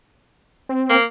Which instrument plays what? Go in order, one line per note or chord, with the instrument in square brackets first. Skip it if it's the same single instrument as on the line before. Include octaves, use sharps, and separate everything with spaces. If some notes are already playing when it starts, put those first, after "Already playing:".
[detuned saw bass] C4
[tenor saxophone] A#3